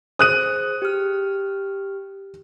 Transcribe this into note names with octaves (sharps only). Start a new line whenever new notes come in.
G#4 C5 D#6 F#6 D#7
G4 F6